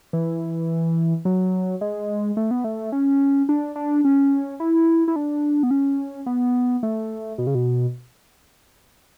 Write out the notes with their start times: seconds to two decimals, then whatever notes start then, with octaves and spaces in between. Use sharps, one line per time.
0.13 E3
1.25 F#3
1.81 G#3
2.37 A3
2.51 B3
2.64 A3
2.92 C#4
3.49 D4
3.76 D4
4.05 C#4
4.60 E4
5.08 E4
5.16 D4
5.63 B3
5.71 C#4
6.26 B3
6.83 A3
7.38 B2
7.47 C#3
7.55 B2